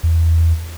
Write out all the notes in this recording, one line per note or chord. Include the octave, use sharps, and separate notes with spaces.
E2